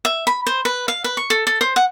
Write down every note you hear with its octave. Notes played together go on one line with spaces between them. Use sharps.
E5
B5
C5
B4
F5
B4
C#6
A4
A4
C5
F#5